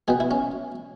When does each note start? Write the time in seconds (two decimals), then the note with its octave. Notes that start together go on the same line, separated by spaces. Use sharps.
0.08 B2 B3 G#4
0.20 E4
0.31 C#4